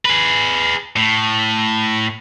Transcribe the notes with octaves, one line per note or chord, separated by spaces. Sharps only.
G#4 B4
A2